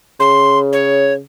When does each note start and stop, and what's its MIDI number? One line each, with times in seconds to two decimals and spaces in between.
0.20 1.20 49
0.20 0.59 84
0.73 1.13 73